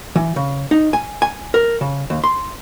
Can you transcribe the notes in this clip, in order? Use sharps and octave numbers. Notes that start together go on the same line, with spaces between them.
E3
C#3
D#4
G#5
G#5
A#4
C#3
D#2
C6